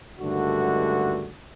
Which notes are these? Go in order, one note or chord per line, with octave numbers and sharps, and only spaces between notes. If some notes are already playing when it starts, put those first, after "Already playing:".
C#2 G2 D3 D#3 A3 F#4